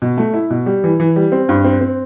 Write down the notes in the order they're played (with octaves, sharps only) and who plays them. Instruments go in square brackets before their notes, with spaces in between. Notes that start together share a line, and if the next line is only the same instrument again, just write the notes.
[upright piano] B2
A3
E4
B2
G3
E3
E3
G3
C4
G2
C4
C4